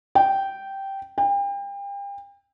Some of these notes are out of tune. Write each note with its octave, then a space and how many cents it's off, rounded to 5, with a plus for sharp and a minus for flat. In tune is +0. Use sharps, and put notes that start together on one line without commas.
G5 -10
G5 +35